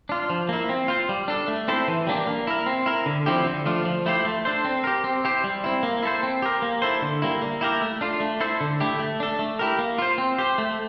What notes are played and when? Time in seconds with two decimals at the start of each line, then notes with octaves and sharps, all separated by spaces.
0.09 D4 F4
0.30 F3
0.49 A#3 E4
0.69 C4
0.88 F4 C5
1.09 G3
1.28 D4 A4
1.48 A3
1.68 C4 E4 A4 C5
1.88 E3
2.07 G3 A#3 D4 G4
2.27 A#3
2.47 E4 A#4
2.66 C4
2.86 E4 A#4
3.06 D3
3.26 F3 C4 E4 G4
3.46 D3
3.66 F3 A3 D4 F4
3.85 F3
4.06 A3 E4 G4 C5
4.25 A3
4.45 D4 A4 C5
4.65 C4
4.84 G4 A#4
5.04 C4
5.24 E4 G4 C5
5.44 G3
5.64 C4 E4
5.83 A#3
6.03 E4 A4 C5
6.23 C4
6.42 G4 A#4
6.62 A#3
6.82 E4 A4 C5
7.02 D3
7.22 G3 A#3 E4
7.42 A#3
7.61 E4 G4 A#4
7.82 A3
8.01 D4 F4
8.20 A3
8.40 E4 A4 C5
8.61 D3
8.80 A3 E4 G4
9.00 A3
9.20 D4 A4
9.39 A3
9.59 E4 G4 A#4
9.79 A#3
9.98 F4 C5
10.18 C4
10.38 G4 C5
10.58 A3